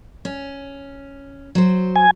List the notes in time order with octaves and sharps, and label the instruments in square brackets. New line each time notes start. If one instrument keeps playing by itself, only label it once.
[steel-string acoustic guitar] C#4
F#3 C5
[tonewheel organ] G#5